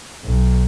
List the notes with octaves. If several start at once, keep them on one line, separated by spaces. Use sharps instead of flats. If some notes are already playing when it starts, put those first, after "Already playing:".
B1